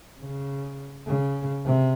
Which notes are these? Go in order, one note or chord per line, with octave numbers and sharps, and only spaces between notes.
C#3
C#3
C3